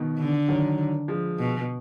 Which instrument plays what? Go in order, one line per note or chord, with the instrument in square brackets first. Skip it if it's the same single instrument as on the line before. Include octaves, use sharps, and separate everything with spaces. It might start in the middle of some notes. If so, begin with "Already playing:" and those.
Already playing: [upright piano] B2 D#3
[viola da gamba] D3
[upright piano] D#3 F#3
F3 G#3
[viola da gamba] B2